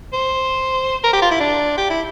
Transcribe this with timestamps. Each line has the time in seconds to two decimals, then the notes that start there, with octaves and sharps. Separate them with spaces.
0.13 C5
1.04 A#4
1.13 G4
1.22 F4
1.31 E4
1.40 D4
1.77 G4
1.90 E4